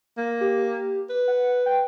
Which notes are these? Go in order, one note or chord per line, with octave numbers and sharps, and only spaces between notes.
A#3
G4
B4
F#5
G5